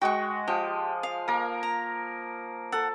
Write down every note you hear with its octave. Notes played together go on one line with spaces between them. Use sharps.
G#3 F#4 G5 C#6
F3 G4
F5
A#3 A#4
A#5
A4 F#5